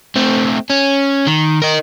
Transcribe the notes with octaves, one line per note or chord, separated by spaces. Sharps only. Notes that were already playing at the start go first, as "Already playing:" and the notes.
A3 C4
C#4
D#3
D#4 A#4